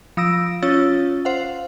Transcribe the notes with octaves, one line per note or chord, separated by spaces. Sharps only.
F3 D#6 E6 A#6 D7
C#4 F4 C#5 E6 A6
C5 F5 F#5